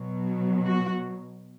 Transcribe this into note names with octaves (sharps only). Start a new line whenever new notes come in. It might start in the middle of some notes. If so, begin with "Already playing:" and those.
Already playing: B2 F#3
F#4